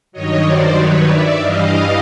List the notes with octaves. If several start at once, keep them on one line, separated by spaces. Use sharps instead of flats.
G2 D#3 F#3 C#5 D#5
C5 D5
B4 C#5
D5 E5
G2 E3 G3 D#5 F5